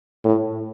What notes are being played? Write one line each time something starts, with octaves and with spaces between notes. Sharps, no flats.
A2